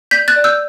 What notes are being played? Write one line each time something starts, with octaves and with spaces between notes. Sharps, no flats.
D5 G6 B6
F#6 A6
D5
E6 G6